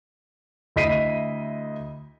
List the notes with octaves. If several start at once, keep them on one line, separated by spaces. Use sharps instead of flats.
D2 E4 D#5 B6 C7 D#7